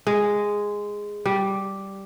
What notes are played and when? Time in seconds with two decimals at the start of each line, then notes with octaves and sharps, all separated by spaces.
0.07 G#3
1.26 G3